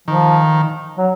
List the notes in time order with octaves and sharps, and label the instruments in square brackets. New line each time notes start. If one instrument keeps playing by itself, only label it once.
[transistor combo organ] D#3 [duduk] F3
[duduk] F#3